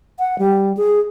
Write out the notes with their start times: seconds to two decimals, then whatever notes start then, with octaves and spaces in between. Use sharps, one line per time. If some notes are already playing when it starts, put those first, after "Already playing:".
0.19 F#5
0.39 G3
0.77 G#4